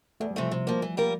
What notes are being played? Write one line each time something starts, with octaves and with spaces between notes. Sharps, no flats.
E2 A3
G3
C3 E3 F3 A3
C3
F3 A#3
E3
G3 A#3 F4 A#4